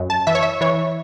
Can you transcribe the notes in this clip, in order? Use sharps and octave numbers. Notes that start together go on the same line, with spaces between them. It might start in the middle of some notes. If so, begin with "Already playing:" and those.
Already playing: F#2
A5
E3 E5
C#5
E5
E3 C#5